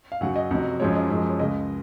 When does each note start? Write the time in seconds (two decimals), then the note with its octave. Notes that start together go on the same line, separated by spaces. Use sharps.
0.12 F5
0.21 F#2 C#3 F#3 F#5
0.36 D#5
0.51 F2 C3 F#3
0.80 F#2 F3 G#3 C#5
0.95 D#5
1.10 F#2 F3 G#3
1.30 C#5
1.39 C#2 C#3 G#3 D#5